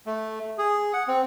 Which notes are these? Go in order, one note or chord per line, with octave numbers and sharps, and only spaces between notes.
A3
G#4
F#5
C4